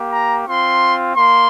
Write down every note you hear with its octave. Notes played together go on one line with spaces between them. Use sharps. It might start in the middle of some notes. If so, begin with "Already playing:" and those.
Already playing: A#3 G4
A#5
C4 F4 C6
A#3 C6